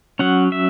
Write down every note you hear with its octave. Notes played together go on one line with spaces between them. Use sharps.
F#3 C#4 F#5
E5